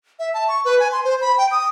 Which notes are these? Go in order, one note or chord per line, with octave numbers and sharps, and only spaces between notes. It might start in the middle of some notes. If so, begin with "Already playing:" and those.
E5
A5
C#6
B4
G#5
C6
C5
B5
G5
D#6